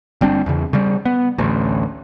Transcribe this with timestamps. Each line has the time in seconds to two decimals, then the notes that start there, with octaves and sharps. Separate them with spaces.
0.21 G1 G3 C4 D4
0.46 E2 C#3
0.73 C#3 G3
1.05 B3
1.38 A1 D2